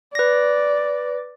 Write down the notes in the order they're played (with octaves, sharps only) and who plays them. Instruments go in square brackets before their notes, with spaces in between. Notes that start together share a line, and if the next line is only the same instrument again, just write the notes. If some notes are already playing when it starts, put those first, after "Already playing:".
[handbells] B4 A#6 [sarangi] D5